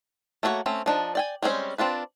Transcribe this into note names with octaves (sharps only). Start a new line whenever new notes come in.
A3 A#3 D4 F#4 C#5
A3 C4 C#4
F3 D4 D#4
D5 G5 G#5
G3 G#3 C4 C#4 C5
C4 D4 F4 B4